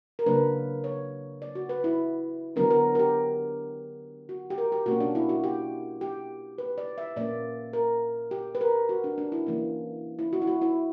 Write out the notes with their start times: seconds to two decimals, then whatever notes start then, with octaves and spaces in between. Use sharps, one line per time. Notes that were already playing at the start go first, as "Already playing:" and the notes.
0.19 A#4
0.26 C#3 F#3 A#3 D4 B4
0.84 C#5
1.42 D5
1.55 F#4
1.69 B4
1.84 E4
2.56 D3 F#3 B3 D4 A#4
2.70 A#4
2.95 A#4
2.99 G4
4.29 F#4
4.50 G4
4.58 A#4
4.72 G4
4.86 B2 A#3 C#4 F#4
5.00 D4
5.15 E4
5.29 F#4
5.44 G4
6.01 G4
6.58 B4
6.78 D5
6.98 E5
7.16 A#2 A#3 C#4 D5
7.73 A#4
8.31 G4
8.55 B4
8.61 A#4
8.89 F#4
9.04 D4
9.18 D4
9.32 E4
9.47 E3 A#3 C#4
10.19 E4
10.33 F#4
10.42 E4
10.47 F#4
10.61 E4